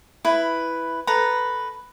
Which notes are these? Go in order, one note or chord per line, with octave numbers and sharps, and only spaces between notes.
E4 B4
A4 B4 A#5